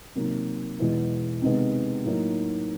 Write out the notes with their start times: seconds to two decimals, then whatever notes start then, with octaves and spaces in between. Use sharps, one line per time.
0.15 C3 D#3 F#3 A#3
0.79 E2 B2 G#3 B3 E4
1.42 C3 D#3 G#3 B3
2.04 A2 F#3 A#3 D#4